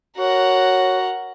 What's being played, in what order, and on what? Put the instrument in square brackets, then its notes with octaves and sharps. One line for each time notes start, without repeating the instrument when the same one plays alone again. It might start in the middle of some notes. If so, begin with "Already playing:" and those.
[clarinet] F#4 [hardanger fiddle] A#4 F#5 [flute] C#5